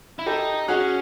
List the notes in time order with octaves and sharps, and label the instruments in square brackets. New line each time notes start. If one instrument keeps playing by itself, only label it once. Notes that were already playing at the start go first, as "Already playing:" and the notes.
[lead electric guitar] E4
[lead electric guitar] D#4 [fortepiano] G4 A4
[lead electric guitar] C#4 [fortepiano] F#4 G#4